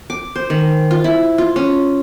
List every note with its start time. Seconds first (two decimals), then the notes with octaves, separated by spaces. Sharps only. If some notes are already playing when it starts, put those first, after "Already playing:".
0.10 D6
0.36 C5
0.50 D#3
0.91 F4
1.04 E4
1.38 F4
1.56 C#4